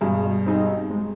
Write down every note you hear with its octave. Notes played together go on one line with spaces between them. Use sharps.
G2 B2 G#3
C4 D#4 G#4
G#3